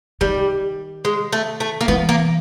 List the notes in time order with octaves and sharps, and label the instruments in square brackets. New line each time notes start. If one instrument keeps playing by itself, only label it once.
[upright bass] D#3 [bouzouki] G3
[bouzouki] G#3
A3
A3
A#3
[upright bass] E3 [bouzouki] B3
[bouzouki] A#3